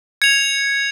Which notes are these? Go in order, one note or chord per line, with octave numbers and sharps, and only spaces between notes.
G#6 C#7 F7